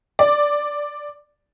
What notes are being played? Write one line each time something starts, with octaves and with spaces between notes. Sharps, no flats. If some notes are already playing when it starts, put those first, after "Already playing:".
D5